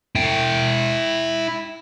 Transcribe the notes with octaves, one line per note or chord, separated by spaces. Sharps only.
E4 G5